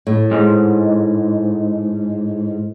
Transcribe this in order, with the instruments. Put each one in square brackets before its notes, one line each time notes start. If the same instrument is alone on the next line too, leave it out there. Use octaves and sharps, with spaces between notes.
[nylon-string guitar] A2
[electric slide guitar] G#2